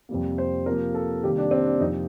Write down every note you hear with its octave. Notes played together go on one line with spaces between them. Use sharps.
F2 C3 G3 A#3
C5
C3 F3 A#3 A#4
A4
C3 D#3 G3 A#3 G4
D4
C4
D4
F2 C3 F3 A#3 D#4